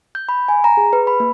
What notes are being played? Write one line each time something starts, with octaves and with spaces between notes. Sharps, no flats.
G6
B5
G#5
A#5
G#4
B4
B5
A#3